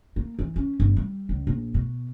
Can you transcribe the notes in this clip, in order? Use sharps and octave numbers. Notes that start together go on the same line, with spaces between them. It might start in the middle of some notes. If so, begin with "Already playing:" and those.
A#3
E3
C#4
G1
G3
C#2
A#1
B2